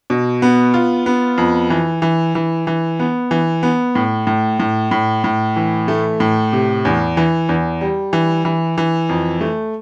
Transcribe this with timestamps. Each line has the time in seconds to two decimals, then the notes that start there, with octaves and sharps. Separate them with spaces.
0.10 B2
0.42 B3
0.74 F4
1.06 B3
1.38 F2
1.70 E3
2.02 E3
2.35 E3
2.67 E3
3.00 B3
3.31 E3
3.63 B3
3.95 A2
4.27 A2
4.60 A2
4.91 A2
5.24 A2
5.56 E3
5.88 A3
6.20 A2
6.53 C3
6.85 E2
7.17 E3
7.49 E2
7.81 G3
8.13 E3
8.45 E3
8.78 E3
9.09 F2
9.41 A3